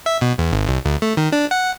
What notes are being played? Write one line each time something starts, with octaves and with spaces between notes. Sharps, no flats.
E5
B2
E2
G#1
C2
D2
A3
D#3
D4
F#5